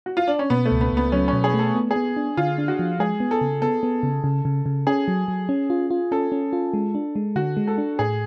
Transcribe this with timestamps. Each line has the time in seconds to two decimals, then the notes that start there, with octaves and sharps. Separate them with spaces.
0.06 F#4
0.17 F4
0.28 D4
0.39 C#4
0.50 B2 B3
0.66 A3
0.71 C#2
0.81 B3
0.92 C#2 B3
1.12 F#3 C#4
1.28 B2 C#4
1.44 G#4
1.54 A3
1.59 A4
1.75 B3
1.91 G#4
1.96 B3
2.17 D4
2.37 D3 F4
2.58 D4
2.68 F#4
2.79 F3
2.99 G#3 G#4
3.20 B3
3.31 A4
3.41 C#3
3.62 B3 A4
3.83 B3
4.03 C#3
4.24 C#3
4.45 C#3
4.66 C#3
4.87 C#4 G#4
5.08 F#3
5.28 F#3
5.49 C#4
5.70 F4
5.90 F4
6.12 C#4 A4
6.32 C#4
6.53 F4
6.74 G#3
6.95 D4
7.16 G#3
7.36 D3 F#4
7.57 G#3
7.67 A4
7.78 D4
7.99 A2 G#4